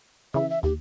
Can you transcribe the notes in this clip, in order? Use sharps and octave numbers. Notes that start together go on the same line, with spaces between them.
C#3 E3 E5
E5
D#2 G4